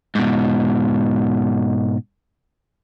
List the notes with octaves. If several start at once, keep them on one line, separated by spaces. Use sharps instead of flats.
G#2 B2